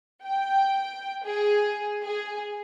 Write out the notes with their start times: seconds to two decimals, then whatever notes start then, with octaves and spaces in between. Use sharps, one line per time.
0.25 G5
1.25 G#4
2.04 G#4